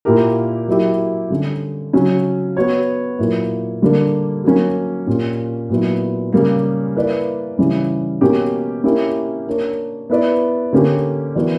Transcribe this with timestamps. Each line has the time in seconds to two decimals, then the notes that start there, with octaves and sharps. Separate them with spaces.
0.05 A#2 A#3 E4 G4 A#4
0.68 F#3 A#3 E4 G4
1.30 D3 G3 C#4
1.93 C#3 F#3 C#4
2.57 B3 F#4 C#5
3.19 A#2 F#3 A#3 E4
3.82 D3 G3 A#3 D4
4.44 F#3 A#3 C#4
5.07 A#2 A#3 C#4 G4
5.70 A#2 F#3 B3 E4
6.33 C#3 G3 A#3
6.96 A#3 E4 B4 D5
7.58 C#3 E3 G3 C#4 E4
8.21 B2 A#3 C#4 G4
8.84 A#3 C#4 E4 G4
9.47 A#3 D4 A#4 C#5
10.10 B3 E4 B4 D5
10.73 D3 A#3 C#4 G4
11.35 E3 B3 F#4 A#4 D5